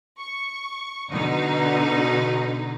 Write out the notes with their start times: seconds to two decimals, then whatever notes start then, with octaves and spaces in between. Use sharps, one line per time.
0.19 C#6
1.10 B2 D3 D#4